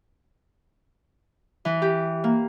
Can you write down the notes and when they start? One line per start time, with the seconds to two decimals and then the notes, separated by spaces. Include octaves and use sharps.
1.65 E3
1.82 G4
2.24 A#3